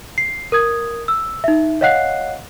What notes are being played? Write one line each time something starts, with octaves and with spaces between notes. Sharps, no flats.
C7
A#4 D#6 G#6
E6
D#4 E5
C#5 D#5 F5 F#5 F#6 C7